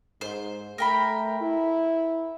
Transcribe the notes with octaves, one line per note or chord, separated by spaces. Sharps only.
G#2 C5
A3 A#4 G5 B5
E4